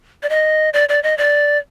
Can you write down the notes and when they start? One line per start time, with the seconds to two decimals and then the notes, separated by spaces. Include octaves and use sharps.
0.23 D5
0.29 D#5
0.73 D5
0.89 D5
1.03 D#5
1.18 D5